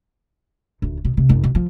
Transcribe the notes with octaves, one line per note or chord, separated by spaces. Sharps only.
D#1 D2
B2
C3
F#1 C#3
B2
F3